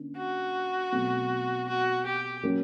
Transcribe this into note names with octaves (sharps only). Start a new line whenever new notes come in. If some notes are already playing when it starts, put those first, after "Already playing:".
Already playing: D3 A#3 C#4
F#4
B2 F#3 A3 C4
F#4
G4
F#3 A#3 C#4